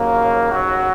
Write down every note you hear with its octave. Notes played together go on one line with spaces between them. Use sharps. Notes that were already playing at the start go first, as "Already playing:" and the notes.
Already playing: D#2 C#3 F#3 A#3
F#3 F#4